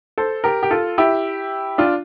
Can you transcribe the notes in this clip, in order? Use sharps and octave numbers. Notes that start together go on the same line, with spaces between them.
A4 C5
G4 A#4
G4
F4 A4
E4 G4
D4 F4